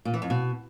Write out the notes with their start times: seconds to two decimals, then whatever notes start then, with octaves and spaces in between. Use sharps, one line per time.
0.05 A#2
0.14 E3
0.22 F2
0.30 B2